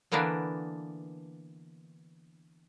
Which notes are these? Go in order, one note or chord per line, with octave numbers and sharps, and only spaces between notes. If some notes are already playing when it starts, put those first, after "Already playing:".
D3 E3 A#3 B3 D4